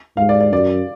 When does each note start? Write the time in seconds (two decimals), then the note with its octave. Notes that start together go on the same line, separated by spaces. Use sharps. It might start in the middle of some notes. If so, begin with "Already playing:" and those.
0.17 G#2 F5
0.29 D5
0.41 D5
0.52 F#2 D5